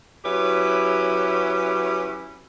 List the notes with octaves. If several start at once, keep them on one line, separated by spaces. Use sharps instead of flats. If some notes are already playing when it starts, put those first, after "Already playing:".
F#3 C#4 E4 G4 B4